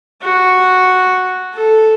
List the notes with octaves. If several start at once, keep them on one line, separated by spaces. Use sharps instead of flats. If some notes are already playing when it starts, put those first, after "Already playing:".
F#4
A4